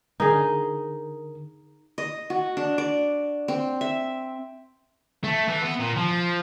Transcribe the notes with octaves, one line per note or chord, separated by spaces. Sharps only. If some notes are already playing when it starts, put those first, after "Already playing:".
D3 D#4 G#4 A#4
D#5
F#4
D4
D5
C4
E5
A3
E3
B3
A#2
F3